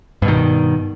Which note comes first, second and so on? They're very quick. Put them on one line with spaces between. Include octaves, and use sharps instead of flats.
G2 B2 D#3